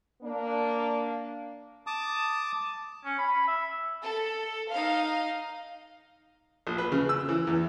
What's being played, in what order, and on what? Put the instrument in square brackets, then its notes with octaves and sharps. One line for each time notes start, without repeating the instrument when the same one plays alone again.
[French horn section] A#3 D4
[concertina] A5 D6 D#6
[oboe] C#4
B5
E5
[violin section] A4
D#4 F5
[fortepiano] A#1
B4
C#3
E6
E3
E2